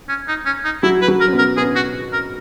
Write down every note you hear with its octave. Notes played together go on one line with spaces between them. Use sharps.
C#4
D#4
C#4
D#4
F#3 E4 F#4
B4
F#3 F#4
A#4
C#4
B2 B3
A#4
B2 B3 G#4
F#4
A#4